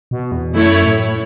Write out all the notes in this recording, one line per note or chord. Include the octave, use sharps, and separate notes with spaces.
B2
E2
F#2 A3 E4 C#5
A2